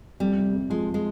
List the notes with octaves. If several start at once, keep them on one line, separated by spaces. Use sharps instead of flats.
F2 G3
C3
F2
F3 G#3
G#3